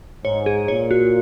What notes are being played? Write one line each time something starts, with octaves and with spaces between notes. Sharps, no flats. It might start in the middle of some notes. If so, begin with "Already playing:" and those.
G#2 C#5
G#4
A#2 C#5
F#4